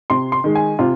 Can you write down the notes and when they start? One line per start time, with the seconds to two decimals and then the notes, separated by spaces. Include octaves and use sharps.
0.10 C3 C6
0.32 C6
0.44 D#3 G#3
0.55 G#5
0.79 C3 F4